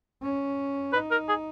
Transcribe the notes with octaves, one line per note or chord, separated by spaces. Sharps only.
C#4
D#4 B4
A#4
G#4